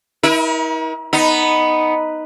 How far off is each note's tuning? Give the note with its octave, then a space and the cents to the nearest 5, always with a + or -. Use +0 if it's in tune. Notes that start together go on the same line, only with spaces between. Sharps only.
E4 -45 A#4 +40
B3 +0 D#4 +0